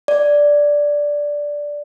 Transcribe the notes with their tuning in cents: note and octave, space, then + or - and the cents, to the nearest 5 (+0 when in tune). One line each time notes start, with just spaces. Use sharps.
D5 -5